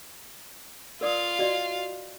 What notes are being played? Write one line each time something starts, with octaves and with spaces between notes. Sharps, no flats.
F4 A#4 D5 F5 D#6
F#4 D5 D#5